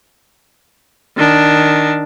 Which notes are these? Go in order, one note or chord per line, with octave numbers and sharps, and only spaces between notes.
D#3 D4